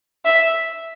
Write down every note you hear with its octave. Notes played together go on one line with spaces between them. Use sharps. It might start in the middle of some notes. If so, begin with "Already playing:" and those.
E5